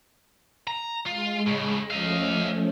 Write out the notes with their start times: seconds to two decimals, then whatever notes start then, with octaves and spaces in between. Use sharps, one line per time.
0.67 A#5
1.06 G#3 F4
1.47 A2 C#3
1.91 F3 A3 C#4 D#5 F5